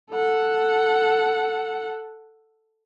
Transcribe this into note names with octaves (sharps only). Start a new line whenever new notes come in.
A4 F#5